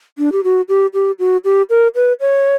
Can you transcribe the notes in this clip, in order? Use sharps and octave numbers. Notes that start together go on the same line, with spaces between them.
D4
G4
F#4
G4
G4
F#4
G4
A#4
B4
C#5